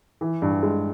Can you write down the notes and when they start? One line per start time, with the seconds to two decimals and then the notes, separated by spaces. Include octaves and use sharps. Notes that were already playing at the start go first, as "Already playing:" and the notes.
0.21 E3
0.42 G2
0.63 G#3